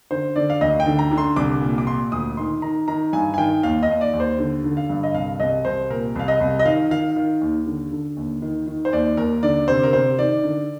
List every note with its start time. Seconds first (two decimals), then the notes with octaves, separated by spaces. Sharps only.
0.11 D3 C5
0.36 D3 D5
0.50 F5
0.61 D2 D#5
0.80 G5
0.86 D3
0.99 A#5
1.11 D3
1.18 C6
1.36 C2 D6
1.61 A#2
1.78 D6
1.87 A#2 C6
2.12 D2 D#6
2.37 D#3 C6
2.62 D#3 A#5
2.88 D#3 A#5
3.13 G2 G#5
3.34 G#5
3.38 D#3 G5
3.63 D#2 F5
3.83 D#5
3.88 D#2
4.01 D5
4.14 D#2
4.20 C5
4.39 D3
4.64 D3
4.77 F5
4.90 G2
5.03 D#5
5.14 C2 F5
5.40 C2 D#5
5.65 C2 C5
5.90 A#2 A#4
6.15 C2 F5
6.28 D#5
6.40 C2
6.59 D#5
6.65 D#3 F5
6.91 D#3 F5
7.16 D#3
7.41 D#2
7.66 D3
7.92 D3
8.17 D#2
8.42 D#3
8.67 D#3
8.85 C5
8.93 D#2 D5
9.17 D#2 A#4
9.43 D3 D5
9.68 C3 C5
9.83 A#4
9.93 C3 C5
10.18 D#3 D5
10.43 D3